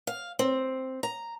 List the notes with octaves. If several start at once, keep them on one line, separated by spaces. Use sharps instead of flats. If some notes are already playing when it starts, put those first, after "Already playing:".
F5
C4
A#5